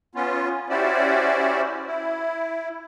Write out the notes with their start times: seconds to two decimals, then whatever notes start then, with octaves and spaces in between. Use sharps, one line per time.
0.15 B3 C#4 F4
0.70 C#4 E4 F#4 G4 C5 D5
1.87 E4